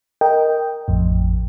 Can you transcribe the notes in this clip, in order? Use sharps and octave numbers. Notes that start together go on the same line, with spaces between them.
A#4 D#5 G5
A1 F2 A2